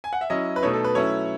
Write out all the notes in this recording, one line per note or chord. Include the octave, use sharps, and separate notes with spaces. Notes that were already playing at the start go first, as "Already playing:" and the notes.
G#5
F#5
E5
F#3 C#4 E4 D#5
B4
B2 A3 D#4 C#5
A4
B4
F#3 A3 C#4 E4 C#5